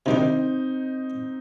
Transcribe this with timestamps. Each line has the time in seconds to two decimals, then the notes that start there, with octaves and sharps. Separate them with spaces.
0.06 C3 D#3 G3 C4 D4 D#4